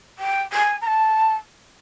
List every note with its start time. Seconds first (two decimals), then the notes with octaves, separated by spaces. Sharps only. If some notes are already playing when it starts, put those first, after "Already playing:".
0.19 G5
0.53 G#5
0.81 A#5
0.87 A5